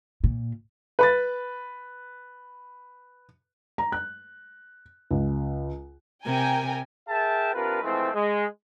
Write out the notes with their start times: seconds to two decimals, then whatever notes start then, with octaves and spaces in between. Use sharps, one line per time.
0.24 A#2
0.99 B4 B5 A6
3.78 A#5
3.92 F#6
5.11 C#2
6.26 C3 A#4 G5 G#5
7.08 G#4 A#4 E5 G5 A5
7.53 C3 D4 F4 A#4 B4
7.82 E3 F3 G#3 A3 C4
8.14 G#3